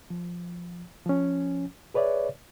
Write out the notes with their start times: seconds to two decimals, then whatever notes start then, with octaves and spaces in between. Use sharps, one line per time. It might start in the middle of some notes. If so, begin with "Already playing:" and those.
0.10 F3
1.06 F3 C#4
1.94 G#4 B4 C#5 D5 E5